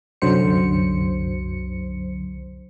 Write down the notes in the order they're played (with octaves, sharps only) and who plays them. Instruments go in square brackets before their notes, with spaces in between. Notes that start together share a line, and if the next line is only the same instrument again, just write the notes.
[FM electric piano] C2 F#2 D3 F#3 C5 C#7